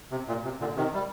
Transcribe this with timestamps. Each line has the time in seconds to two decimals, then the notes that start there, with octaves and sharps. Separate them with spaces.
0.12 C3
0.28 A#2
0.44 C3
0.60 A#2 D3
0.76 C3 D#3
0.94 G3